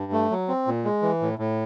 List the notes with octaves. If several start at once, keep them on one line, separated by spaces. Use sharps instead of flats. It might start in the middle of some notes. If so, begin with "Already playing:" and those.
Already playing: G2
A3
F#3
C4
A#2
G#3
E3
A2
A2